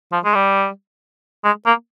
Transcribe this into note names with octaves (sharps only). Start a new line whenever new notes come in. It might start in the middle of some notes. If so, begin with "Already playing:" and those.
F3
G#3
G3
G#3
A#3